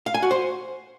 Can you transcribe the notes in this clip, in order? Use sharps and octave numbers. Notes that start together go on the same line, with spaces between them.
F5
G#5
F#4
C5